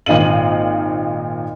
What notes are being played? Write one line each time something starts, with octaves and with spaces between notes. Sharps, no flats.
G#1 A#2 D#4 F5 D#7 F#7